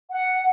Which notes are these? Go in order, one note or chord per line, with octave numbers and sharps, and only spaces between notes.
F#5